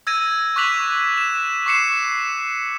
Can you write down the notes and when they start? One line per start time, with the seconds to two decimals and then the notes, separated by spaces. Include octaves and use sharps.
0.07 E6 G#6 A#6 D#7
0.56 C#6 D6 F#6 B6 F7 F#7
1.17 E7
1.66 C#6 D6 C7 C#7 E7